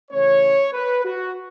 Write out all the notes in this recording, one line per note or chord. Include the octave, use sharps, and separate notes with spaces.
C#3 E3 A3 C#4 C#5
B4
F#4